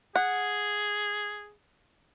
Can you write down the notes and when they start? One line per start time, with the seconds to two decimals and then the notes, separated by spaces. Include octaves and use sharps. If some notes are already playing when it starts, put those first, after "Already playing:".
0.16 G#4 F#5